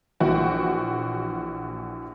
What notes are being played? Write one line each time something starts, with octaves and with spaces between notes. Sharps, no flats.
A#1 A#2 E3 F#4 G5